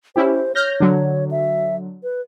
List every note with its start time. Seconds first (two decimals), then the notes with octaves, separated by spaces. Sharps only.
0.16 C#4 E4 G4 C5
0.55 C#5 F6 G6 A#6
0.80 D3 F#3
1.31 E5
2.03 B4